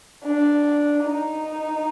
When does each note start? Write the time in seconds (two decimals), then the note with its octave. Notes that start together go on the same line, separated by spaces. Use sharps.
0.24 D4
1.03 D#4